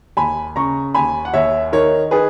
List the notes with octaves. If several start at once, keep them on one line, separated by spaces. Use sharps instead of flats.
D#2 G#5 B5
C#3 A#5 C#6
D#2 G#5 B5
F#5
D#2 C#5 E5
D#3 A#4 C#5
D#3 G#4 B4